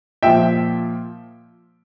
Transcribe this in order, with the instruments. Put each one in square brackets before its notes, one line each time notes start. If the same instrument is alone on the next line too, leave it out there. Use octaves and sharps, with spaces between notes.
[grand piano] A#2 F3 E5 G5